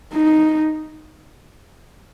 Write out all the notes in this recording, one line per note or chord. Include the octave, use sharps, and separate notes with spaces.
D#4